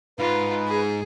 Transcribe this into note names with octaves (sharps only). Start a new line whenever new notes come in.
G#2 F4 B4
G#4